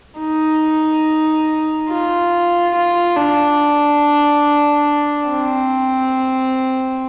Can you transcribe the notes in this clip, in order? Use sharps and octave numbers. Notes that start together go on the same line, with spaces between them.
D#4
F4
F4
D4
C4